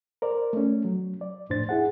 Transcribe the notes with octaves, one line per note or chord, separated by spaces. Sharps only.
A#4 C5 D5
A3 C#4
F#3
D5
F2 A2 D4 C5 A6
E4 G#4 F#5